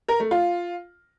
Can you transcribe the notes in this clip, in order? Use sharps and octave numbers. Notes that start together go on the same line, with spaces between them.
A#4
A3
F4